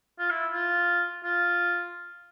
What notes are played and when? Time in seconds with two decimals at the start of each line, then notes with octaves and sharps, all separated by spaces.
0.19 F4
0.30 E4
0.53 F4
1.24 F4